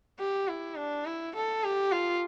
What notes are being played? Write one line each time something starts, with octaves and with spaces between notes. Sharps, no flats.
G4
E4
D4
E4
A4
G4
F4